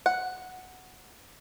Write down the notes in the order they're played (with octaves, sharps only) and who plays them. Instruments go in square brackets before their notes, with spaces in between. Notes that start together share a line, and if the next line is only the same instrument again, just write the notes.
[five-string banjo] F#5